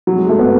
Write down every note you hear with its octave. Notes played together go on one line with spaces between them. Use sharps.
F#3
G#3
A3
B3